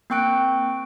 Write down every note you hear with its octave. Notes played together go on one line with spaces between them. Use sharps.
A#3 C4 G5 C#6 F#6 D7